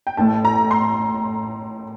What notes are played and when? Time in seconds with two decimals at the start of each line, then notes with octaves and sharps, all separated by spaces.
0.07 G5
0.17 A1 A2 A3 A5
0.45 A#5
0.71 C6